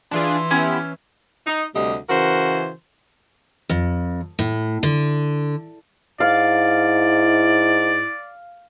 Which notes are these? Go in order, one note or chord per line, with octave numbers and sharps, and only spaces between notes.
E3 D4 F4 G#4 C6
B3 C#4 E4 G4
D#4
D2 C3 G3 A3 D#5
C#3 E3 F#4 A#4 C5
F2
A2
D3
G#2 E4 D5 F5